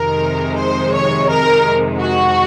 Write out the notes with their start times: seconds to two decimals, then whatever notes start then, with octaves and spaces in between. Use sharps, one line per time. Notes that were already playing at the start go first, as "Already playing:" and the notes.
Already playing: F2 C3 D#3 G#3 A#4
0.57 C5
0.93 C#5
1.29 A#4
2.00 F#4